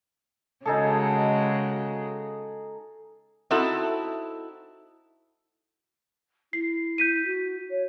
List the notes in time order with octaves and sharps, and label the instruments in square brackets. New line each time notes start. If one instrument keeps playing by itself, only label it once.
[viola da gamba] C#3 G#3 F#4 [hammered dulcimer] D#4 G#4 A4
[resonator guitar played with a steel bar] C4 D#4 E4 F#4 A4
[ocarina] E4 [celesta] C7
[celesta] G6 B6 D#7
[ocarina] F#4
C#5